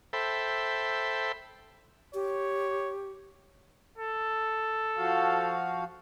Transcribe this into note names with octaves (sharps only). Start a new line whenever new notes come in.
A4 C5 E5 G5 B5
G4 C#5
A4
F3 F#4 F5